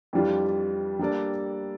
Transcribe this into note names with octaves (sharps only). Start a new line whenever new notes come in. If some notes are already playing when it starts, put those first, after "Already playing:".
F2 E3 G3 D4 F4
G3 A#3 D4 A4 D5